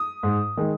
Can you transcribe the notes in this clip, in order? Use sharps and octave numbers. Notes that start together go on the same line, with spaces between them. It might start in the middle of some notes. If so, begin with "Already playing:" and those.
Already playing: D#6
G#2
D#3 G#3